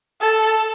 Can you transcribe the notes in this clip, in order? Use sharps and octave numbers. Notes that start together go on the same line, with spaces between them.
A4